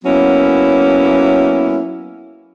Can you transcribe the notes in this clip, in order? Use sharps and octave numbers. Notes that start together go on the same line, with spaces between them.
F#3 A#3 B3 C#4 E4